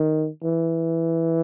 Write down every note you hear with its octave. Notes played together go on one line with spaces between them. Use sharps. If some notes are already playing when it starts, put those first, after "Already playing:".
Already playing: D#3
E3